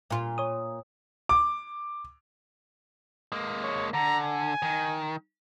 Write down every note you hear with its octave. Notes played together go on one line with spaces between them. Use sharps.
A#2 F4
C#5 D#6
D6
G#3 A#3
C#5
D3 A#5
G#5
D#3